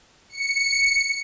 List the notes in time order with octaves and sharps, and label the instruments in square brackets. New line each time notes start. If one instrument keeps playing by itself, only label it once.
[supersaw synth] C#7